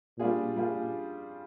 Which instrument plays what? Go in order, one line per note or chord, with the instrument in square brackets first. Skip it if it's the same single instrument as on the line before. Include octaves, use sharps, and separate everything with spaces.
[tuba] A#2 [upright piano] G3 D4 F4 G#4
[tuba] A#2 [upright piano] G3 D4 F4 G#4